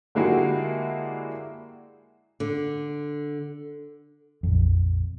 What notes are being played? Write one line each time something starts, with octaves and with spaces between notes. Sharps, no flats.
D3 G#3 A#3 E4 F#4 G4
D3
A#1 F2